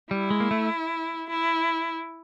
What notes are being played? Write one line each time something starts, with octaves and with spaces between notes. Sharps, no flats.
G3 E4
G#3
A#3
A3
E4